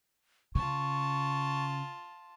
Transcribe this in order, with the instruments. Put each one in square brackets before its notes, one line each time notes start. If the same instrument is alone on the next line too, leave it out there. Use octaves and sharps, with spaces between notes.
[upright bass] C#3 [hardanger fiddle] F4 A5 [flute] C#6